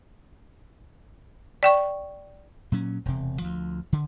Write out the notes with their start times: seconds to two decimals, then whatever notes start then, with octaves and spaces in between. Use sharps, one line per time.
1.63 D5 G5 C#6
2.72 A#2 F#3 C#4
3.05 E1 C3
3.42 D2 F3
3.93 D3